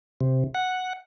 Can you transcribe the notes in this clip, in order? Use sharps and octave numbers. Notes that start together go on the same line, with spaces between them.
C3
F#5